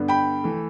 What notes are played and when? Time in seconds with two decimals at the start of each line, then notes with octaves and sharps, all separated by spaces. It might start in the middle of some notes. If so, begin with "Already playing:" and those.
Already playing: G2 D3 B3
0.08 G5 B5
0.44 E3 A3